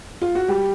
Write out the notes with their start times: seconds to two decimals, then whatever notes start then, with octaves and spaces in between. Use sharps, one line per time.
0.22 F4
0.35 F#4
0.48 G3 G4